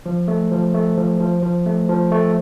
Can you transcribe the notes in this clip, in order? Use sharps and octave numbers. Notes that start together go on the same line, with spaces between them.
F3
A3
F3
A3
F3
F3
F3
A3
F3
A3